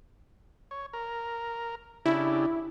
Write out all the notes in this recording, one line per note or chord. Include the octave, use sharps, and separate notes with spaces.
C#5
A#4
C#3 D4 E4 G4